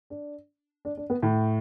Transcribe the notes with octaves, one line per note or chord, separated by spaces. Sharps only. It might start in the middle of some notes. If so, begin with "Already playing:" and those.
D4
D4
D4
B3
A2